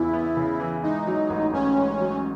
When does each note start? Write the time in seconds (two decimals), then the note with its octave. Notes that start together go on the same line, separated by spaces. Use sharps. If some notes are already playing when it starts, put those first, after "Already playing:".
Already playing: E2 C#3 E3 E4
0.13 B3
0.37 C#3
0.60 E3
0.83 G#2 D#4
1.07 F#3
1.30 A1
1.53 A1 C#4
1.76 G#2
2.00 F#3